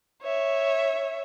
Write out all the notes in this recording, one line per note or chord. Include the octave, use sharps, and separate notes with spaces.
C#5 E5